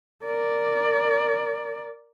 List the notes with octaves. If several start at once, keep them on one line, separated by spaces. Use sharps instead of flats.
A#4 D5